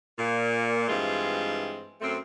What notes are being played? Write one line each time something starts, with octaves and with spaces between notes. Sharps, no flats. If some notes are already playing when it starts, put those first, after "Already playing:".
A#2
G2 E3 G#3 C4 F4
F#2 A3 C4